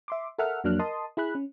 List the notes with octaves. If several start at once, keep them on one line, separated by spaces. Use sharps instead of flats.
E5 C6 D6
A4 A#4 E5 F#5 F6
F2 F#3 A#3 D4 F6 F#6
A#4 D#5 A5 C6 D#6
E4 G#4 B5 F#6
C#4